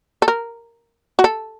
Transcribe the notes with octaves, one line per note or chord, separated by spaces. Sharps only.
A4
A#4
F#4
A4